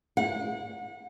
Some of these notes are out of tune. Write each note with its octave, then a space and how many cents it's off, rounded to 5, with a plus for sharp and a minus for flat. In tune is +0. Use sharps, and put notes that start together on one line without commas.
F#5 -30